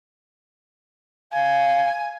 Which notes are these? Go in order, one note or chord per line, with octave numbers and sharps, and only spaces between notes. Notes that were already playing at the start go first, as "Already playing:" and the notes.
F5 G#5